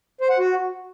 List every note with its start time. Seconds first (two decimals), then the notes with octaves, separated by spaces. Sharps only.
0.21 C5
0.30 F#5
0.39 F#4